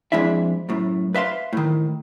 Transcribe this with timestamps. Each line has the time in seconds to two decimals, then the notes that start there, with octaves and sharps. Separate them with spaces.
0.12 F2 G#3 D4 E4 E5
0.69 F#2 A2
1.14 B4 E5 F5 C6
1.53 A2 D#3